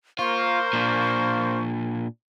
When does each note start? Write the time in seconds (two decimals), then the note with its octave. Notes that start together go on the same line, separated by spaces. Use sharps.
0.19 A#3 F4 C5 C#6
0.73 A#2 D4